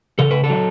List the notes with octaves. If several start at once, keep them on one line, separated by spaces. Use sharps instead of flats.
C#3 A4
B4
A4
F#3